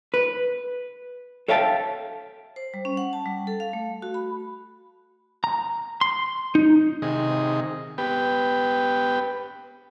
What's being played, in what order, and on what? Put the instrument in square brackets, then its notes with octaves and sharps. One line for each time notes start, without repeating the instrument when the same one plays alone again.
[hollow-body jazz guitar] B4
A4 C#5 E5 F5 G5 A5
[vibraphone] C5
G3
C#4
F#5
A5
G3
A4
F5
A3
F#4
B5
[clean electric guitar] A#5
C6
D#4
[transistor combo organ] C3 D#3 G#4 D#5
B3 G4 B4 G5